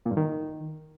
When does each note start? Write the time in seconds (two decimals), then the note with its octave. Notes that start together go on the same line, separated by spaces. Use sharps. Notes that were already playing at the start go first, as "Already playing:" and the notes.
0.05 A#2
0.11 G2
0.17 D#3